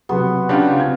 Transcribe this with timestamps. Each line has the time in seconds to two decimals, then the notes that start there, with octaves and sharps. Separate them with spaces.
0.09 C3 F#3 B3 F#4 G#4 C6
0.49 C#3 D4 F4 G4 C#5
0.80 C4 G#6